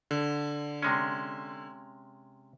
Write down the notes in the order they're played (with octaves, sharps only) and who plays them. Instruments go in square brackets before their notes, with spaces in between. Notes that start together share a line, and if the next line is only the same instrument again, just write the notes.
[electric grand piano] D3
[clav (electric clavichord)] C3 G#3 C#4